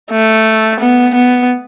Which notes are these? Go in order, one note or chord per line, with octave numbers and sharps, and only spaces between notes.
A3
B3
B3